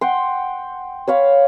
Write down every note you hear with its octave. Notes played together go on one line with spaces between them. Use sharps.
F#5 G5 C6
C#5 F5 B5